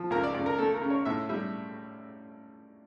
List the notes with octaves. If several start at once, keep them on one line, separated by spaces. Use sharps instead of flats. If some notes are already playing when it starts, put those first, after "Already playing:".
Already playing: F3
C#2 A#4
D5
C#2 D5
A#4
A3 A4
A#4
C#3
C#5
A2 E5
G3 E5